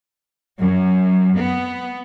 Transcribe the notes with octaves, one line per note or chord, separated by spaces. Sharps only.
F#2
B3